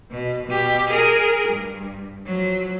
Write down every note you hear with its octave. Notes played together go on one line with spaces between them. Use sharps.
B2
B2 G4
G#4 A#4
G2
F3 F#3